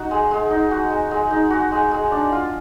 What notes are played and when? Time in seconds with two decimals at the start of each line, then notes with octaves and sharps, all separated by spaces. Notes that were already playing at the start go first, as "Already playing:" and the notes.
Already playing: D#4 F#4
0.11 G#3
0.31 G#3
0.50 D#4
0.71 F#4
0.90 G#3
1.11 G#3
1.31 D#4
1.50 F#4
1.72 G#3
1.91 G#3
2.11 D4
2.32 F4